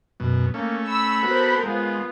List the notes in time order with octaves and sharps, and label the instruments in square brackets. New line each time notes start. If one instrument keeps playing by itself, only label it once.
[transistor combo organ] F#2 B2
[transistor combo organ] A3 C#4 [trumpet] A#3
[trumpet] B5 [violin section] E6
[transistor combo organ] B3 F#4 [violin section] A4 A#4 C5
[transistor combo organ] G#3 [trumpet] B3 [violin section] F4